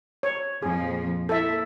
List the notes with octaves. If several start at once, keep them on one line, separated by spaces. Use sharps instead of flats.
C#5
F2 A#2 F3 G#4
A#3 E4 A4 E5